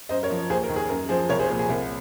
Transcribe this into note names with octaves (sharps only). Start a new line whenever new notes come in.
F#2 C5 D#5
A#4 C#5
F3
D#2 G#4 C5
A#4
D#3
G#4
F#2 A#4
F3 G#4 C5
C2 A#4 C#5
G#4 C5
A#2 F3 A#4
G#4
C2 A#4